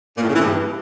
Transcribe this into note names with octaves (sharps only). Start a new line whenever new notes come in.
A#2
A2
C#3
E3
G2